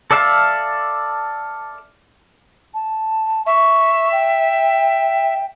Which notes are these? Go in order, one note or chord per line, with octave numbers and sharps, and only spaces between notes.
A4 D5 E5 F5 A5
A5
E5 C#6
G5